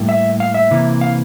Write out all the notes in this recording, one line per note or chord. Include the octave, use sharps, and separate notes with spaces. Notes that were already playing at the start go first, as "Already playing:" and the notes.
Already playing: A2 G3 A#3
E5
F5
E5
C3 E3 A#3
F5